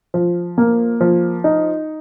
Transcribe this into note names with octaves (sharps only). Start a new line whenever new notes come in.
F3
A#3
F3
D#4